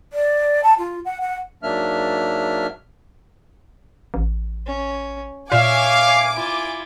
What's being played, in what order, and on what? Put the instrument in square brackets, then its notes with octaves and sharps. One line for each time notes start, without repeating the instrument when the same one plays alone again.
[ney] D5
A5
F4
F#5
F#5
[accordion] G#2 F#3 A#3 D4 E5 F6
[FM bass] A1
[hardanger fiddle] C#4
[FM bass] A#2 [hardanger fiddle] C#5 E5 [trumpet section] F5 [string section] G#5 D6
[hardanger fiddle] E4 F4